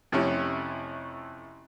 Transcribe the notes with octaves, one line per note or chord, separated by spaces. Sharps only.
F2 C3 A3 C#4 E4